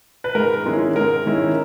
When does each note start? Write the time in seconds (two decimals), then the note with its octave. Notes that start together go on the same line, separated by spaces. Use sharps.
0.24 B4
0.35 G#2 A#4
0.65 D#3 G#3 C#4 E4
0.96 G#2 A#4
1.26 D#3 G#3 C#4 E4